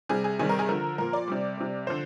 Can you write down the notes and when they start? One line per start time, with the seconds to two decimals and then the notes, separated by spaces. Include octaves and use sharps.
0.09 C3 G3 G#4
0.24 G#4
0.39 C3 D#3 G3 G#4
0.49 A#4
0.59 G#4
0.69 D3 F3 A#4
0.98 A#2 F3 A#4
1.13 D5
1.28 C3 G3
1.57 C3 G3
1.87 D3 F3 C5